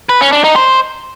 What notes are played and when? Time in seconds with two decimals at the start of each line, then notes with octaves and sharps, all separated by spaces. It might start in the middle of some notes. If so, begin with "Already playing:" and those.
0.09 B4
0.21 C#4
0.32 D4
0.44 D#4
0.56 C5